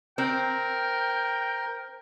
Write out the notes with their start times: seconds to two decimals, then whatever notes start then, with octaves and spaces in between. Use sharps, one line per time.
0.18 C4 A#4 G5